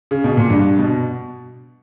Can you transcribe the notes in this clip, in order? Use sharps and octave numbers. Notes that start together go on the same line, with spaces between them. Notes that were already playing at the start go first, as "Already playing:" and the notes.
C#3
B2
A#2
G2
B2